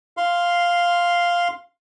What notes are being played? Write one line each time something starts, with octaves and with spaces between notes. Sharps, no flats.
F5 C6